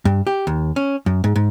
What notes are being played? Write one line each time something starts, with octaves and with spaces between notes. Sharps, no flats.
G2
G4
D#2
C#4
F#2
G#2
G#2